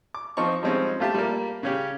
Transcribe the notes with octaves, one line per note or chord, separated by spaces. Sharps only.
D6
F3 C4 D#4 C#6
F3 G3 G#3 C4 C#4 D#4
A3 F4 G4 E5 A5
G3 A#3
C#3 C#4 G4